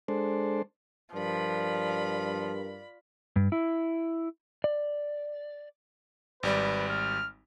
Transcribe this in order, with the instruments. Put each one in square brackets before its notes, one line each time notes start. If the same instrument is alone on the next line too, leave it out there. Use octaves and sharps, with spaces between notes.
[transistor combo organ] G#3 D4 A4 C5
[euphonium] G2 [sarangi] F3 [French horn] A#4 [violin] D5 B5
[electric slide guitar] G2
E4
D5
[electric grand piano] G#1 G3 D5 [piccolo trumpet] B4
[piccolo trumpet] F6